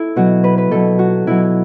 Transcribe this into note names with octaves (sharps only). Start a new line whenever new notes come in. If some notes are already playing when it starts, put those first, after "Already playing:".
Already playing: E4 A4
B2 F#3 F#4
B4
B4
B2 F#3 A4
F#4
B2 F#3 E4